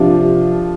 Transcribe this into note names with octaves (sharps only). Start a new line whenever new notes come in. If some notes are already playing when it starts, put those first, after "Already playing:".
Already playing: C3 F3 D4 F4